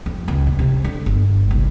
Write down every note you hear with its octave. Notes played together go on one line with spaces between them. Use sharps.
F2
C#2
A#2
C3
D3
G1
C2